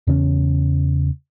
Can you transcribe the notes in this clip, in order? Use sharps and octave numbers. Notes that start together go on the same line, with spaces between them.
E2 C#3 C4 C#4